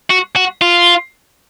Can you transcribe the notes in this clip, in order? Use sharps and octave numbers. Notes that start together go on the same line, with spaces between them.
F#4
F#4
F4